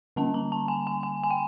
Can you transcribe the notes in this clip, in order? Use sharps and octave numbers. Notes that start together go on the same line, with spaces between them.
D3 G3 A#3 C#4 A5
A#5
A5
G#5
G#5
G#5
G#5
G5